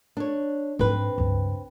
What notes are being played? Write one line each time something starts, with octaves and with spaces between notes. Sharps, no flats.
D4 C#5
G#2 F#3 C4 B4
C#2 G2